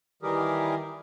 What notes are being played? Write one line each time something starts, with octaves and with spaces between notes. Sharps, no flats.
D#3 E3 G3 G4 G#4 A#4